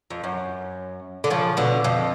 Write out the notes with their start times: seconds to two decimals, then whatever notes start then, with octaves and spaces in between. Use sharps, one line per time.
0.10 F2
0.23 F#2
1.24 D3
1.30 C#3 F3
1.57 B2 D3
1.84 F2